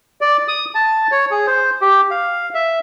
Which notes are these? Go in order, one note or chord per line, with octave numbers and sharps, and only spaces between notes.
D5
D#6
A5
C#5
G#4
C5
G4
F5
E5